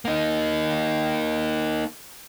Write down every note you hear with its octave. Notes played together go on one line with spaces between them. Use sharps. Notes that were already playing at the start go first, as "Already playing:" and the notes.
A#3 D#4